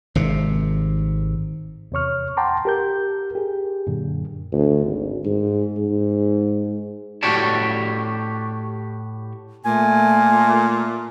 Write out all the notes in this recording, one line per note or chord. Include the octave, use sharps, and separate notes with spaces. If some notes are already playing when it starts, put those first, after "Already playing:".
G#1 C3
E2 C3 C#5 C#6 F6
F#5 G5 A5 A#5 C6 D6
G4 A#4 G6
G4 G#4
F#2 A#2 D3
D2
G#1
G#2
G#2
A2 F#4 G4 C#5 D5 A5
A#2 A3 G#5